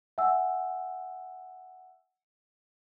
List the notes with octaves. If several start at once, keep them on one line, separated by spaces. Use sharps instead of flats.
E5 F#5 G#5 E6